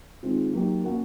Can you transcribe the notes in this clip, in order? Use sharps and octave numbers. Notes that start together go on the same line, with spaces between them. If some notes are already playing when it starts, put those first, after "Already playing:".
D#3 G#3 C4 F4
F#3 A#3 D#4 G4
A#3 C#4 F#4 A#4